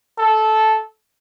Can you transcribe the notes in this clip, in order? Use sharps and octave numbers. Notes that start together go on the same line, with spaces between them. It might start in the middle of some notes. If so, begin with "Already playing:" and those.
A4